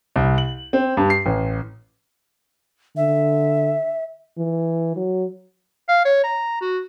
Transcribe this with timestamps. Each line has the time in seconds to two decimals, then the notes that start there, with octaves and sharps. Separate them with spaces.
0.16 C2
0.38 F#7
0.73 C4
0.97 G2
1.10 C7
1.26 A1
2.97 D3 E5
4.38 E3
4.97 F#3
5.89 F5
6.05 C#5
6.24 A#5
6.61 F#4